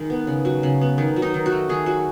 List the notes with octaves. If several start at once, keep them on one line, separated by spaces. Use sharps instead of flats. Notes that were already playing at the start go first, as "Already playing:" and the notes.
Already playing: D#3 G#3
B3
C#3
F#3
C#3
B3
D#3
F#3
D#4
D#3
F#4
A3
D#3 G#4
F#3 F#4